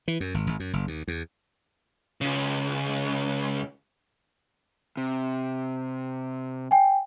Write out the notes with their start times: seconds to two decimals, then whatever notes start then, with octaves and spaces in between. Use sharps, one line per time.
0.08 E3
0.20 F#2
0.34 G#1
0.47 G#1
0.60 F#2
0.73 F#1
0.87 D#2
1.08 E2
2.21 C#2 C#3
4.97 C3
6.71 G5 G#5